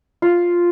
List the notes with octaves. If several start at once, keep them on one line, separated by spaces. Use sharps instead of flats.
F4